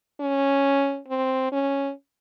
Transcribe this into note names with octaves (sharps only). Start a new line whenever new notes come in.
C#4
C4
C#4